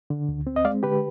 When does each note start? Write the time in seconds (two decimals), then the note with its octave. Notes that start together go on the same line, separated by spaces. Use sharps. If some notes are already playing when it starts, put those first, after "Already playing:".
0.10 D3
0.29 D2
0.47 C4
0.56 D#5
0.65 G#3 D5 F5
0.83 D3 G4 B4